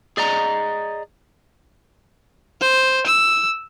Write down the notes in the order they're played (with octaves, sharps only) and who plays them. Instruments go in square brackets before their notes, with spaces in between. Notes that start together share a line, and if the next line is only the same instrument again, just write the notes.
[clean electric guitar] G#4 D5 D#5 A#5
[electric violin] C5
E6